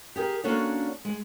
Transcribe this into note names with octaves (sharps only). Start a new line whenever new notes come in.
G4 G#4 A#4
A#3 C#4 D4 F#4 A4 C#5
G#3